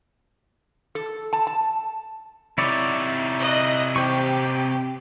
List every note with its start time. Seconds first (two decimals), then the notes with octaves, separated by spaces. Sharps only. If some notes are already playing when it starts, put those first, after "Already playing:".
0.95 A4
1.33 A5
1.47 A5
2.58 C3 D#4 E4 C#5 D5
3.39 D#5 F#6
3.96 G4 C5 C#6